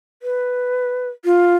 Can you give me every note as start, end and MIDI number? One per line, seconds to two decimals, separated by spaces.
0.23 1.09 71
1.25 1.56 65